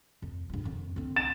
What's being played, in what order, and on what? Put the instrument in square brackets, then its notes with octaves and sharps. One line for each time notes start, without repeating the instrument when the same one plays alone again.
[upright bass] F2
G2 F4
F2 D#3
D3 C4
[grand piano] A6 E7